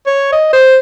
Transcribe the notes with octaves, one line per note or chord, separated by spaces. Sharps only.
C#5
D#5
C5